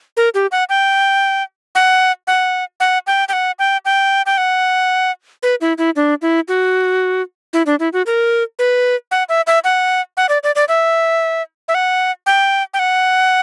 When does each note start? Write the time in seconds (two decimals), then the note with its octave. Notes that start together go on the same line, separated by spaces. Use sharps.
0.17 A#4
0.34 G4
0.52 F#5
0.69 G5
1.75 F#5
2.27 F#5
2.80 F#5
3.07 G5
3.28 G5
3.33 F#5
3.59 G5
3.85 G5
4.26 G5
4.38 F#5
5.43 B4
5.61 E4
5.78 E4
5.96 D4
6.22 E4
6.48 F#4
7.53 E4
7.66 D4
7.80 E4
7.93 F#4
8.06 A#4
8.59 B4
9.11 F#5
9.29 E5
9.47 E5
9.64 F#5
10.17 F#5
10.29 D5
10.43 D5
10.55 D5
10.68 E5
11.68 E5
11.75 F#5
12.26 G5
12.74 G5
12.79 F#5